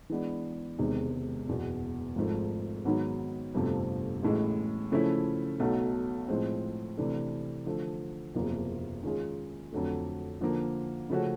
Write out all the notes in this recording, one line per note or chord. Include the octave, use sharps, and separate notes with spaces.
E3 G#3 B3 D4
E1 E2 C3 D#3 G#3
F#1 E2 B2
G#1 G#2 F3 A3
G#2 D#3 F#3 B3
G1 F2 C3 F3 A3
A1 A2 E3 G#3
C#3 F3 A3 C#4 E4
B1 B2 F#3 A3
A2 F3 G#3 C4
C3 E3 A3 D4
D3 F3 A3
F#1 E2 C3 F3 A#3
D#3 G#3 C#4 F4 G#4
F2 D3 F#3 A3
D3 F3 A#3
C#3 F3 A3 C#4 F#4